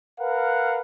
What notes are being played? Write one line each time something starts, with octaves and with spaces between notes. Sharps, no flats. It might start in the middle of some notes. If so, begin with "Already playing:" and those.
A#4 B4 F5 F#5